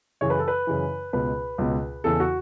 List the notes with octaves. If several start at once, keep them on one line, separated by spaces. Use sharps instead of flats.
F#2 C#3 E3 C#5
B4
A4
B4
F#2 C#3 E3
C#2 B2 B4
C#2 B2
E2 C#3 E3 A4
F#4